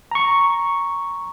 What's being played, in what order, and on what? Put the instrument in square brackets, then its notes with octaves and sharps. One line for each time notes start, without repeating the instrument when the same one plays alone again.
[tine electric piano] A#5 C#6